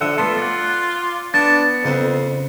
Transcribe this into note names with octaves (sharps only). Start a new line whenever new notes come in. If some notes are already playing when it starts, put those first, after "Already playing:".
D3 F3 E5 F#5
A3 B3 F4 A4
D5 F#5
B3 D4 A6
F2 C#3 C4